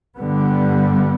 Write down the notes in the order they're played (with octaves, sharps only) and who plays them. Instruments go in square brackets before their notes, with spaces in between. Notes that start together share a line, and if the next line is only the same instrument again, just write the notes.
[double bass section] G2 D3 G3 B3